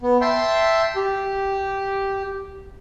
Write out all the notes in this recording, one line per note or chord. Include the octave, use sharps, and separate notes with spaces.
B3
E5 G5 A5 C6
G4